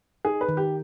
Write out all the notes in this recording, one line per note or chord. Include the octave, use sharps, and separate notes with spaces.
D#4 G#4
B4
D#3
G4